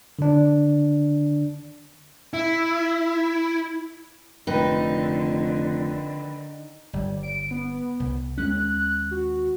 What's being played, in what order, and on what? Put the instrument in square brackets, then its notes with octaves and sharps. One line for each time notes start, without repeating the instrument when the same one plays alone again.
[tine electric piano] D3 D4
[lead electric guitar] E4
[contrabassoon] F1 [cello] D3 D#3 [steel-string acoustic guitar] D#4 [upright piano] B4 G5
[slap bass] G1 [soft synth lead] G3
[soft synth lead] D7
B3
[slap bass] C2
[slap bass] D#2 G#3 C#4 [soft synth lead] F#6
[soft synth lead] F#4